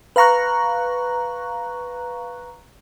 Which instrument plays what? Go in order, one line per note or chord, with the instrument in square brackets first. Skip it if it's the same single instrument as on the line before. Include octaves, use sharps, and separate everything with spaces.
[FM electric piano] B4 F5 A#5 C#6 F#6